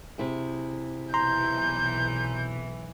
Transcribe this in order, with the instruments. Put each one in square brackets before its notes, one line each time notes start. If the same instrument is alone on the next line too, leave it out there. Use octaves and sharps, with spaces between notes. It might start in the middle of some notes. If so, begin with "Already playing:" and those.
[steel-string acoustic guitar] C3 E4 G#4
[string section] B1 E3 [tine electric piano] A#5 C6 [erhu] G6